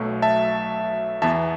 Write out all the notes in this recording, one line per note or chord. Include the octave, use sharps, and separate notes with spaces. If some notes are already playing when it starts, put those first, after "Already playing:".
Already playing: B1 B2 F#3 A3
E5 A5
E2 E3 B3 E5 A5